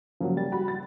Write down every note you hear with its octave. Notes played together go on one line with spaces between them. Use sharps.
C#3 F3 F#3 A#3
G3 A6
F#4 B5
A6